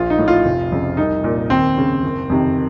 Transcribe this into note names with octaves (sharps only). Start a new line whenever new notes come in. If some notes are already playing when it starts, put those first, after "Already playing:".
Already playing: A#1 F4
D#4
A2
F4
F1
F2 C#3
C2 D#4
A#2
D#2 C4
C#3
F#1
F2 C3 D#3